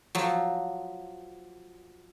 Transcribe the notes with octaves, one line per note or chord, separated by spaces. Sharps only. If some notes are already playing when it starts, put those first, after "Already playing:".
F3 F#3